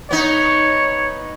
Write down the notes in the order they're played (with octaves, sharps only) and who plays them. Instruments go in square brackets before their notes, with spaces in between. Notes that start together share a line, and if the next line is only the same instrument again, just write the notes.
[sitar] B3 D#4 [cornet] C#5